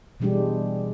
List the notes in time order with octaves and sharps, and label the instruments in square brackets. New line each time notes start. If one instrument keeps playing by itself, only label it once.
[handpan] B2 E3 G3 G#3 D4 G4